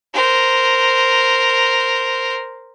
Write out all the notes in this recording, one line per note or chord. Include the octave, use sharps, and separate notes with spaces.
A#4 C5